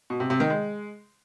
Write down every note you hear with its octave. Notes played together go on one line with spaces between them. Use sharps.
B2
C3
C3
D#3
G#3